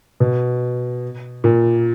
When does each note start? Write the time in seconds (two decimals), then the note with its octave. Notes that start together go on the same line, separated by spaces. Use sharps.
0.20 B2
1.44 A#2